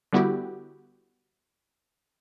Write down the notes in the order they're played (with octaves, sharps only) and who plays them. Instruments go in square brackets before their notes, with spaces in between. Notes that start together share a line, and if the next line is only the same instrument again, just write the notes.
[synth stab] D3 G3 B3 E4 F#4 G4